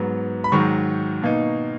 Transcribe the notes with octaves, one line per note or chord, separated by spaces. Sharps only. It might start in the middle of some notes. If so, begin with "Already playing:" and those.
Already playing: G#2 F#3 B3
B5
G#2 D#3 F#3 C#6
B2 A#3 D#4